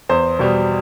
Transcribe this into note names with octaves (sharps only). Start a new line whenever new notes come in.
E2 C5
B2 G3